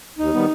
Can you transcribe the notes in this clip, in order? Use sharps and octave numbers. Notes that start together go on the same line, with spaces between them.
D#2 D#4
D#3 G3 B3